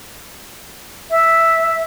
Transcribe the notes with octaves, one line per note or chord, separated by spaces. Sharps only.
E5